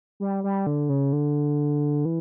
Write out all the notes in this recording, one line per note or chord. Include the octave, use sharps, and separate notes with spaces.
G3
G3
D3
C#3
D3
E3